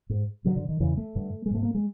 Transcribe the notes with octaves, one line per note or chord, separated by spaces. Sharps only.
G#2
G2 D3 F#3
D3
D#3
E2 C#3 E3
A3
G2 D3
G#3
G#2 A3
A#3
G#3